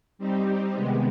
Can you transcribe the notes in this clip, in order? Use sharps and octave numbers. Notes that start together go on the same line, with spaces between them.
G3 C4 D#4 G4
C3 D#3 G#3 B3